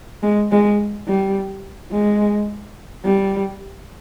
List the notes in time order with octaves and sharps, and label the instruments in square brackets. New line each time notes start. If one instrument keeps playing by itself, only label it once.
[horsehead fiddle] G#3
G#3
G3
G#3
G3